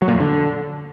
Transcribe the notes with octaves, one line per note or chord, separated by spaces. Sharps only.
F#3
A#2
F2
D3